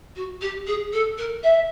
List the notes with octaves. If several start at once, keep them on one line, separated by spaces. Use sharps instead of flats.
F#4
G4
G#4
A4
A#4
E5